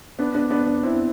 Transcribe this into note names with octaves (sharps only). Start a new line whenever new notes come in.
B3 D4
B3 D4
B3 D4
B3 D4
C4 E4